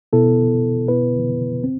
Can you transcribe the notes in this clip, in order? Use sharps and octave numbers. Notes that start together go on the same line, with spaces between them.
B2 B3 E4 A4
B2 B3 E4 B4
C4